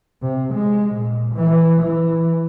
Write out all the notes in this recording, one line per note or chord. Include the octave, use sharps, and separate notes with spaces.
C3
G#3
A#2
E3
E3